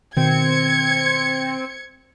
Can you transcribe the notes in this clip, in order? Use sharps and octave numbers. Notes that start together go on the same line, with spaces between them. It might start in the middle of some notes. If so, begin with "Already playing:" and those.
B2 D#3 C4 G#6 C#7